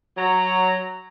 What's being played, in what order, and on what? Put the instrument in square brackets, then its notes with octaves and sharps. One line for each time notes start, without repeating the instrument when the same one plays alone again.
[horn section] F#3 A#5